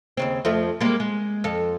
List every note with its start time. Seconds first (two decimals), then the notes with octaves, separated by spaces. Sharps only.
0.17 D#2 C#3 C4
0.45 F2 F3 A3
0.80 G3 G#3 A#3
1.00 G#3
1.44 F2 A4